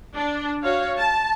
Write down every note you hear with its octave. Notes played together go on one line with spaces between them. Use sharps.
D4
F#4 C#5 F5
A5